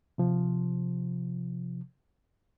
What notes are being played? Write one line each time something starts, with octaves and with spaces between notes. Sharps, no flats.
C3 F3